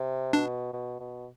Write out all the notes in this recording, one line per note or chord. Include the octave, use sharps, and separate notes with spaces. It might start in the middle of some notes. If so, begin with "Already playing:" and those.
Already playing: C3
B2 D4
B2
B2